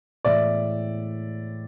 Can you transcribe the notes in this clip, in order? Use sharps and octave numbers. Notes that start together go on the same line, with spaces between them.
A2 E3 G#3 D5 E5